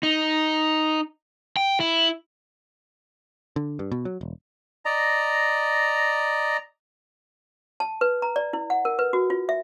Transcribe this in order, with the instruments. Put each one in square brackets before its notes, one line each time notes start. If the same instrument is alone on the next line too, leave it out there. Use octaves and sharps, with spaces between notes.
[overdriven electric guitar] D#4
G5
E4
[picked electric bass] D3
G2
B2
F#3
E1
[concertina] D5 D#5 A#5
[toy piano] A5
B4
A#5
D5
E4
F#5
A#4
B4
F#4
F4
E5